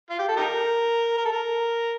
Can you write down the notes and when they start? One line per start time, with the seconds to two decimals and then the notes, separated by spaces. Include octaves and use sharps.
0.10 F4
0.19 G4
0.29 A4
0.37 D#4 G4 A#4
1.18 A#4
1.25 A4
1.32 A#4